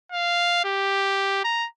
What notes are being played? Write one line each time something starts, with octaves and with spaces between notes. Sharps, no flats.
F5
G4
A#5